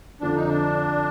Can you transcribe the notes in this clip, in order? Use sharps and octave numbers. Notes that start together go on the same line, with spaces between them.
F2 D3 F3 D4
D#4
D4